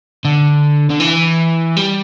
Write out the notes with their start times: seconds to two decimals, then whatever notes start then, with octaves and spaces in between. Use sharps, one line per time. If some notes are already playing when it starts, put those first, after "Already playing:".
0.25 D3
0.90 D3
1.00 E3
1.77 G3